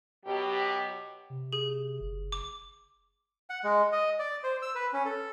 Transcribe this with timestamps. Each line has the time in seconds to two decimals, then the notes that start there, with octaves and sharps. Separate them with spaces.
0.24 B2 F#3 G4
1.30 C3
1.53 G#4
2.00 F#1
2.32 D6
3.50 F#5
3.64 G#3
3.92 D#5
4.19 D5
4.44 C5
4.62 E6
4.75 B4
4.93 C#4
5.05 A4